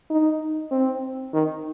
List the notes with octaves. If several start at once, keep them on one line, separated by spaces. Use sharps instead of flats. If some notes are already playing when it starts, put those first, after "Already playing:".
D#4
C4
D#3